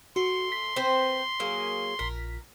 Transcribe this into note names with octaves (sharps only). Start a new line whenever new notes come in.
A3 F#4 C6
B6
C4 B4 C5
F#3 A#3 G#4
A#1 A#4 B6